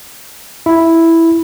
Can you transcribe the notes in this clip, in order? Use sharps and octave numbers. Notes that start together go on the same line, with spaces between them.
E4